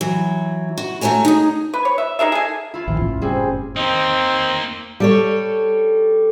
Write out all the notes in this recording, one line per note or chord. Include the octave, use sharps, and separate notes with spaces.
E3 F#3
F#4
A3 F#4 C#5 G#5 A#5
D#4 G#4
B4
C#5
E5
D#4 G#4 A#4 E5
G#4 A4 G#5
E4 F4
A#1 D#2 F3 F4
F#1 A2 C#4
G3 C4 G#4
A#3 C4 D#4
G3 A4 C#5